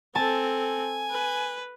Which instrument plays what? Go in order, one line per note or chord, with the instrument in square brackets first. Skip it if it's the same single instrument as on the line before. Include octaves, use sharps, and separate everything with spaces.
[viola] C4 A4 [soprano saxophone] G#5 [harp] A5
[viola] B4